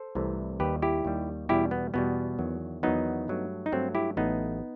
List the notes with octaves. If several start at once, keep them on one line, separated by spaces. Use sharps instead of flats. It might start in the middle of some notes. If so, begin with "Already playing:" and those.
Already playing: A4 C5
C2 C3 E3 A3
D#2 D#3 G3 G4 B4
E4 G4
D#2 D#3 G3
E2 B2 G3 E4 G4
B3
E2 B2 G3 B3
E2 D#3 F#3
E2 D#3 F#3 B3 D#4
G2 F#3 A3
D#4
G2 F#3 A3 C4
E4 G4
A1 A2 F#3 A3 B3 D#4